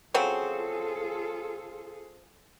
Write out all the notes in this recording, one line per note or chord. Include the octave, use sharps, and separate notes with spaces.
C#3 F#3 C4 F4 G#4 A4